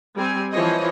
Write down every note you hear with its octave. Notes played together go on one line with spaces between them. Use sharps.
G3 C4 G#5
E3 F3 C5 C#5 D#5